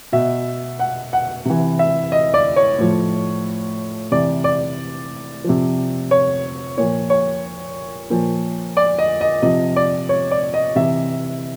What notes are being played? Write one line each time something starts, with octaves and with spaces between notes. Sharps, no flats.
B2 E5
F#5
F#5
C3 E3
E5
D#5
D5
C#5
A2 F3
C3 E3 D5
D5
C3 F3
C#5
A#2 F3 C#5
C#5
A#2 F3
D5
D#5
D#5
C3 F3 D#5
D5
C#5
D5
D#5
C3 E3 E5